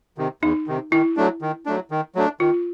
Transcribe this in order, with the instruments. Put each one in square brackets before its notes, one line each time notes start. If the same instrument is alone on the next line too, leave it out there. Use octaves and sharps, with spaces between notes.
[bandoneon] C3 D#3
[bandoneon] E2 [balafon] D#4
[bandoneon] C3 D#3
[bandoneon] D#3 [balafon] E4
[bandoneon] F#3 A3 D4
D#3
F#3 A3 D4
D#3
F#3 A3 D4
[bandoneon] D#3 [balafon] F4